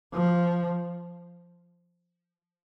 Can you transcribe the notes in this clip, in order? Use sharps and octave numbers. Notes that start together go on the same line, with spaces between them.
F3